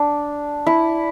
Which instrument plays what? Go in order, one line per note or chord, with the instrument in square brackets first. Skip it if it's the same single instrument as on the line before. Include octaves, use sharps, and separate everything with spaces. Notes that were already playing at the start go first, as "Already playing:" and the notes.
Already playing: [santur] D4
E4